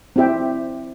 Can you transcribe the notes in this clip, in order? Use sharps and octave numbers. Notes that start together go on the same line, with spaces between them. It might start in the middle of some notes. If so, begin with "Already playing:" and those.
C4 E4 G4 E5 G5